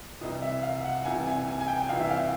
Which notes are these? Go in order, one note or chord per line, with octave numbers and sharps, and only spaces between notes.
C2 C3 E3 D#5
E5
F5
F#5
C2 C3 E3 G#5
G#5
G#5
G#5
G5
C2 C3 E3 F5
E5
F5